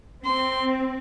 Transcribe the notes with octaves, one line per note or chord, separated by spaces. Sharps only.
C4 C6